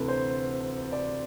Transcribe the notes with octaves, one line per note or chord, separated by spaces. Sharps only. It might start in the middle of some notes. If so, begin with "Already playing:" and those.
Already playing: D2 C3 E3 A4 B4
C5
D5